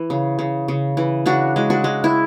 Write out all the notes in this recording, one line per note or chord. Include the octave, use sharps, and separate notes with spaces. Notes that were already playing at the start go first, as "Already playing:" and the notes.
Already playing: E3
C#3
C#3
C#3
E3
C#3 D4 F#4
G#3
D4 F#4
G#3
E4